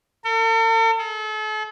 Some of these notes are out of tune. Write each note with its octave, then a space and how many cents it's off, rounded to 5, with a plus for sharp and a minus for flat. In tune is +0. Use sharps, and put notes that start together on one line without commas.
A4 +45
A4 -40